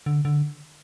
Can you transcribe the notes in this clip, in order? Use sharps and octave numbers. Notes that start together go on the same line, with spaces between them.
D3
D3